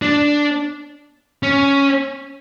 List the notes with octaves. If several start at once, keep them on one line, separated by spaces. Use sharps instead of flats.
D4
C#4